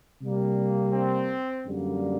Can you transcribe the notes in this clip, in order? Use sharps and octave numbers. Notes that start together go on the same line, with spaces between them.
C3 G3 A#3
C4
F#2 D3 G3 A#3